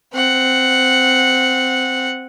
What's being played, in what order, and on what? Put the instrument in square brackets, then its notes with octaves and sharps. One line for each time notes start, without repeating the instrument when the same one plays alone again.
[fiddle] C4 F#5